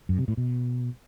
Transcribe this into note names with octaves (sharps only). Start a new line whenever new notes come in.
F#2
C3
A2
B2